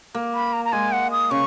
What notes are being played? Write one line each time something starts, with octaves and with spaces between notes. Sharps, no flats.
A#3
B5
A#5
A#5
G#3 G#5
F#5
D#6
C#3 C#6